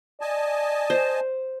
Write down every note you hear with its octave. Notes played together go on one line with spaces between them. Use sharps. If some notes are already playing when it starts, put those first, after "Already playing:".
D5 D#5 G#5 A5
C5